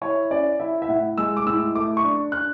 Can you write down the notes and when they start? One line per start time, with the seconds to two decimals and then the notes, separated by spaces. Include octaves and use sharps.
0.01 E4 C#5
0.31 C#4 D5
0.60 E4 E5
0.82 E5
0.89 A2 F#5
1.18 G#3 E6
1.37 D6
1.47 A2 E6
1.75 A3 D6
1.97 C#6
2.04 D4
2.32 D4 F#6